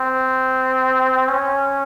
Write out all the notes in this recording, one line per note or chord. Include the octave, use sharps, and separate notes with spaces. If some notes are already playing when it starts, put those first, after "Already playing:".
Already playing: C4
C#4